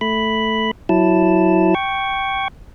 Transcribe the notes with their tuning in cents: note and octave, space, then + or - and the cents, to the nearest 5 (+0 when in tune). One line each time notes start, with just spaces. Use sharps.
A3 +0 B5 +0
F#3 +0 E4 +0 A5 +0
G5 -10 C#6 +0